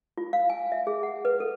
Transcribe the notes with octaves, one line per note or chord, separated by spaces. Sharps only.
F4
F5
G#5
E5
G#4
F#5
B4
A4